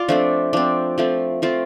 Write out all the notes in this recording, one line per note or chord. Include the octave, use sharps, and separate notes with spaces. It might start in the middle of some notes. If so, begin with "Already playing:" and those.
Already playing: F4 D5
F3 A3 C4 D4
F3 C4 D4
F3 A3 C4
F3 A3 C4 F4